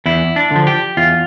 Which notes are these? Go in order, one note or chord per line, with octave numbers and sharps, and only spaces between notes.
E2 E4
D4
D3 F3
G4
E2 F4